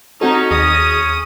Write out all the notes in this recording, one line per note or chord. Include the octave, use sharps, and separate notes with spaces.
C4 C#4 D#4 F#4 A4
D#2 G#4 D#6 A#6